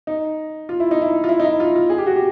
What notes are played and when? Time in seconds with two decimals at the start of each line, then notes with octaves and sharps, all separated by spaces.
0.07 D#4
0.69 F4
0.80 E4
0.91 D#4
1.02 E4
1.24 F4
1.29 E4
1.40 D#4
1.45 E4
1.60 F4
1.75 F4
1.90 G#4
1.98 G4
2.07 F#4
2.16 G4